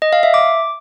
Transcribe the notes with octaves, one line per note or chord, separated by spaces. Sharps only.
D#5
F5
E5
D6